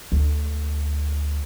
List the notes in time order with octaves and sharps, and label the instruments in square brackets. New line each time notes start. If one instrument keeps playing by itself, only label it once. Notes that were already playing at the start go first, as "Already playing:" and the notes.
[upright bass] D2